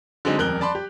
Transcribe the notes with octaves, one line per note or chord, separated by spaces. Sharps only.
D3 F#3 G#3 C4 D#4
D#1 F2 A#4 F#6 G7
D5 A5 B5 C6
G4